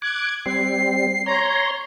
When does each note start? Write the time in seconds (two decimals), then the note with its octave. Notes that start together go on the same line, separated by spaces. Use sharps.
0.02 D6 F#6 G#6
0.46 G3 C4 C7
1.26 C#5 A#5 C6